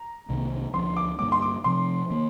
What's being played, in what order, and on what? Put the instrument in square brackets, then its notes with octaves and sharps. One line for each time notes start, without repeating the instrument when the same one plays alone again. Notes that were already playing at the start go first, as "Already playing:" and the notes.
Already playing: [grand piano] A#5
[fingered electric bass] C2 C3 D#3 A#3
[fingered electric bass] D2 D3 F3 [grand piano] C6
[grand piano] D6
[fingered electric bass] G2 D3 G3 A#3 [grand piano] D6
[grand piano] C6
D6
[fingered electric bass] C3 F3 C4 [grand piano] C6
[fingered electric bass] D#3 A#3